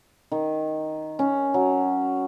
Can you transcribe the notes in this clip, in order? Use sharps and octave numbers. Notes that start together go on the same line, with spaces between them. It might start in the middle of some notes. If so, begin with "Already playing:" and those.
D#3
C#4
F#3